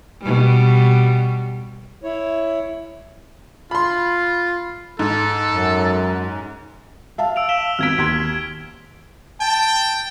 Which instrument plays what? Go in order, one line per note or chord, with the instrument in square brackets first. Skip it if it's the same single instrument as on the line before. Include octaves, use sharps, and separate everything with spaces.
[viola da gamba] B2 G3
[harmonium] E4 C#5
[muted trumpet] F4 [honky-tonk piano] B5 C6
[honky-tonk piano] G#2 [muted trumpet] A4
[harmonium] F#2
[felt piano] E5 F5 A5
[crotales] E6 D7 F7
B6 E7 G7
[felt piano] G#1 B3 B6 [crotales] F6 G#6 D7
[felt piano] D#2 C6 G#6 [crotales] B6
[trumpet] G5 [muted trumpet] A5